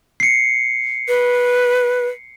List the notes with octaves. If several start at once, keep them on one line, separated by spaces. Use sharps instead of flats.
C7 C#7
B4